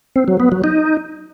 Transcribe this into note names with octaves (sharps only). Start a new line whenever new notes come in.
C4
F#3
B3
F#3
D#4